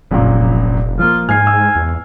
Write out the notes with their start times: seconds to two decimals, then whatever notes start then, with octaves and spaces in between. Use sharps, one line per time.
0.11 F1 A#1 F#2 A#2
0.99 F3 A#3 F4
1.29 G#2 G#5 F6 C7
1.47 E6
1.76 E2